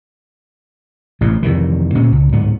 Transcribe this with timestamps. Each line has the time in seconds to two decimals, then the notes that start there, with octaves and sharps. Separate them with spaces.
1.21 A1 A2 C3
1.43 F2 C3 D#3 E3
1.94 D2 A#2 C#4
2.12 C#2
2.33 D1 G#2 B3